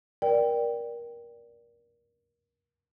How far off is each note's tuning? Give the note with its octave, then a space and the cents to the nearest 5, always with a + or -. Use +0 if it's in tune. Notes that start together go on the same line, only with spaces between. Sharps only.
A#4 +25 D5 +0 G5 +0